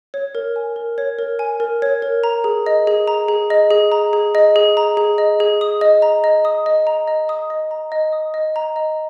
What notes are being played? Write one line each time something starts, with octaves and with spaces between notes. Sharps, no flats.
C#5
A#4
G#5
A#4
C#5
A#4
G#5
A#4
C#5
A#4
A#5
G#4
D#5
G#4
A#5
G#4
D#5
G#4
A#5
G#4
D#5
G#4
A#5
G#4
D#5
G#4
D#6
D#5
A#5
D#5
D#6
D#5
A#5
D#5
D#6
D#5
A#5
D#5
D#6
D#5
A#5
D#5